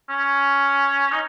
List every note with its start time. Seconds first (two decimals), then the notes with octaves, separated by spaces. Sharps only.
0.10 C#4
1.12 D#4